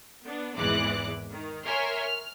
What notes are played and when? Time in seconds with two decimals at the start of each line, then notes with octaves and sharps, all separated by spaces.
0.24 B3 D4
0.57 G#1 E2 E3 G#3 D6 F#6
1.31 D#3
1.65 A#4 C#5 E5 G#5 C6 F6
2.00 F6